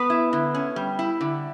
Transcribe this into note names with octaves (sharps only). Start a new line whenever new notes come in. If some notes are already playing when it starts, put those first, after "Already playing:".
Already playing: B3 B4
E4
D3
C#4
G3
E4
D3